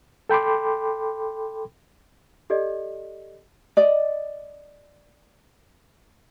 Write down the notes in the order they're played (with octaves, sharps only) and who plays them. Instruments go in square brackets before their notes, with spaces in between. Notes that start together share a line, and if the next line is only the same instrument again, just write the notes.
[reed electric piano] A4 G5 B5 C6 D6
[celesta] G4 A4 D5 D#5
[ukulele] D5 D#5